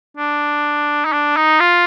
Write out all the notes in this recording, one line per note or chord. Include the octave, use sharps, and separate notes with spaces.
D4
D#4
D4
D#4
F4